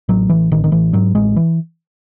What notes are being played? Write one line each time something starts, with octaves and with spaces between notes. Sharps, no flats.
A1 F#3
A1 E3
A1 D#3
D#3
A1 E3
G#2 F#3
A1 G#3
E3